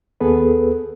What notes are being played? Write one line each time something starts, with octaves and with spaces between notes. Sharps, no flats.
D#2 B3 G#4 A4 B4